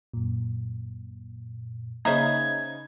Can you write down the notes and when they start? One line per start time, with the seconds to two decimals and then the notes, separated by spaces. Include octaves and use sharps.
0.14 F#2 A#2
2.05 C#3 A#3 D#4 C5 E5 B5 G#6